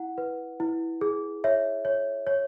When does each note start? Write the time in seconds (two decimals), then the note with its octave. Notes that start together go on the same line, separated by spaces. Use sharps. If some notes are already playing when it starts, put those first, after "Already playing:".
Already playing: E4 F#5
0.18 B4
0.60 E4
1.01 G#4
1.44 C#5 E5
1.85 C#5
2.27 C#5